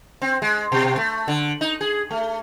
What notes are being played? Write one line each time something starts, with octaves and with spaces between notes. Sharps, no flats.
C4
G#3
B2
A3
D3
D#4
G#4
A3